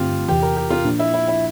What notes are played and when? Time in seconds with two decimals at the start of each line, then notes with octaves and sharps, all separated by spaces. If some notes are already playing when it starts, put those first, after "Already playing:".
Already playing: G2 D3 A3 C4 F4 G4
0.28 E2 C3 E3 G4
0.42 A#4
0.56 G4
0.71 F4
0.85 A#2 F3 A#3 D4
0.99 E4
1.14 E4
1.28 E4